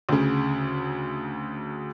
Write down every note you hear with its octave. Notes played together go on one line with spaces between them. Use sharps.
D2 C#3